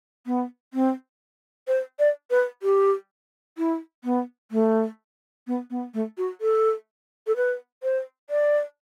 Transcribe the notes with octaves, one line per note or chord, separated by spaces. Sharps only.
B3
C4
C5
D5
B4
G4
E4
B3
A3
B3
B3
A3
F#4
A4
A4
B4
C5
D5